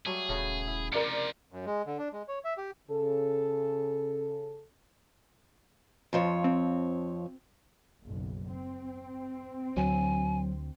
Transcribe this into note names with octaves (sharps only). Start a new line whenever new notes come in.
F#3 G3 A3 G#4
D#1 C#3 A3 B3
E4
C3 F3 A#4 D5 C#7
F#2
G#3
D3
D4
G#3
C#5
E5
G4
C#3 A4
F2 F3 C#5
C4
F#1 B1
C4
D2 F#3 G#5